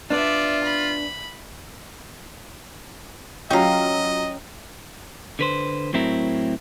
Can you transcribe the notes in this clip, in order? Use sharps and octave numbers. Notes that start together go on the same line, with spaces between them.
B3 D4 F4 D5 E5
B5
F#3 C#4 F4 D#5 F5 G5 A#5
D3 B4 C5
A2 F#3 C4 E4 A#4